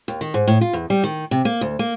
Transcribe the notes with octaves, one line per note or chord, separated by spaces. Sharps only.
D#2
D#3
G#2
A2
F4
E2
G3
D#3
C3
A#3
D2
A#3